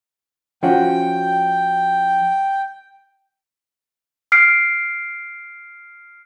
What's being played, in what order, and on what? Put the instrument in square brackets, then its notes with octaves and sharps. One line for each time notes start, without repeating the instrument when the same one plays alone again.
[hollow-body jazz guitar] F3 C#4 F#4 [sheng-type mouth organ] G5
[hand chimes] F6 C7 D7